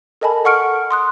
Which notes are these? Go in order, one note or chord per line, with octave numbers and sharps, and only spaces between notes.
A4 A#4 D#5 G#5 A5 B5
A4 F#5 C#6 F6 C#7 D7
C6 D#6 F#6